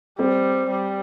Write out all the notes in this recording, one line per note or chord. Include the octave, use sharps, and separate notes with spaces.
G3 C4
G3